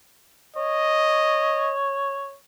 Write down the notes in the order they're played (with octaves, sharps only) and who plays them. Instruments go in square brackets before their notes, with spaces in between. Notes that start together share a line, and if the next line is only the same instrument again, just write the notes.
[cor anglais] C#5 [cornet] D#5